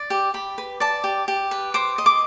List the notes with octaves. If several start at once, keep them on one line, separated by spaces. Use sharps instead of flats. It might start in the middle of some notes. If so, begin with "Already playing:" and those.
Already playing: D5
G4
G4 B5
B4
D5 A5
G4
G4
B4
C5 D6
D#5
D6